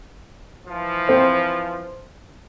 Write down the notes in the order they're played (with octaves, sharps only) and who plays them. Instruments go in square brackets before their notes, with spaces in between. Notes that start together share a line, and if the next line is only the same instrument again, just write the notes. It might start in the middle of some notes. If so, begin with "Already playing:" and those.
[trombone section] E3 F3
[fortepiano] C4